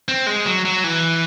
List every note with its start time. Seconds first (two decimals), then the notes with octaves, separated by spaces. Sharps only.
0.08 C4
0.27 G#3
0.46 F#3
0.65 F#3
0.84 E3